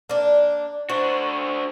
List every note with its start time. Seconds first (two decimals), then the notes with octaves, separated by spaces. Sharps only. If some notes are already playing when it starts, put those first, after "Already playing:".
0.09 A#3 D4
0.89 D4 F#4 C5